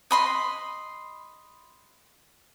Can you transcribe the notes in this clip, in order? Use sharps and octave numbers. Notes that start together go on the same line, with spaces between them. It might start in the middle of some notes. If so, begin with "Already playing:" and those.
D#5 B5 C6